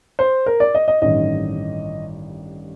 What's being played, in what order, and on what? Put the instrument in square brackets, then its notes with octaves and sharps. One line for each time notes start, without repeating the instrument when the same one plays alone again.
[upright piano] C5
A#4
D5
D#5
D#5
A1 G2 D#3 D#5